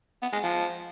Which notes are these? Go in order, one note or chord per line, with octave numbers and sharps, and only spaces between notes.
B3
G#3
F3